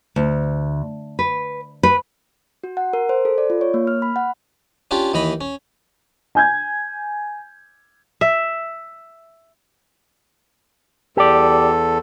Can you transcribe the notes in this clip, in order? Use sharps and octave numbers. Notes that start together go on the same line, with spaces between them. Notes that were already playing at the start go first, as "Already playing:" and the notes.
D2
B4
B4
F#4
F#5
A#4
C5
A4
D5
F4
C#5
A#3
F6
B5
F#5
C#4 D4 F4 G4
D#2 E3 D#5 B5
C#4
G#5 G6 G#6
E5
E2 G4 A4 D5